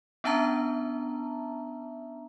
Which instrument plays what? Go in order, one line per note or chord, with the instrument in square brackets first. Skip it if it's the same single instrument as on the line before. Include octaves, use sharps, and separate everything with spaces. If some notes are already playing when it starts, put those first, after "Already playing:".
[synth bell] B3 C#4 D4 E5 A5 A#5